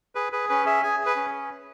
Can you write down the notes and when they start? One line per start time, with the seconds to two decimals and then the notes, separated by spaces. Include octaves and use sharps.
0.15 G#4 B4
0.32 G#4 B4
0.49 C#4 B4
0.66 G#4 E5
0.83 G#4 G#5
1.00 G#4
1.06 B4
1.16 C#4